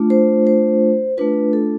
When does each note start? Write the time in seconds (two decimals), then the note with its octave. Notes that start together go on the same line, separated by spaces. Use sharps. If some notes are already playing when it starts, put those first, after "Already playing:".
Already playing: A3 D4 F4
0.10 C5
0.47 C5
1.18 A3 D4 F4 B4
1.53 A4